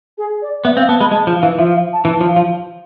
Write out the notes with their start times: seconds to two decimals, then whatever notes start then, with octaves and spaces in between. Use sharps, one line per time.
0.18 G#4
0.42 D5
0.65 B3 E5
0.77 C4 F5
0.88 B3 A5
1.00 G#3 B5
1.11 G#3 A5
1.27 F3
1.35 F5
1.43 E3
1.58 F3 E5
1.70 F5
1.93 A5
2.05 E3 A5
2.21 F3
2.28 F5
2.36 F3